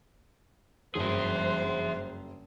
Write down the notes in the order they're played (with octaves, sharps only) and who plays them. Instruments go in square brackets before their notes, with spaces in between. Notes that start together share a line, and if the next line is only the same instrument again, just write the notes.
[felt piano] F#1 [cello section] G2 C5 [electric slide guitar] G#4 E5